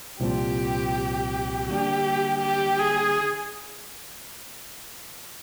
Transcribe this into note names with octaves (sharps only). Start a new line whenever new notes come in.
C2 A#2 F3 C4 G4
D3 G3 A#3 D4 G4
G4
G#4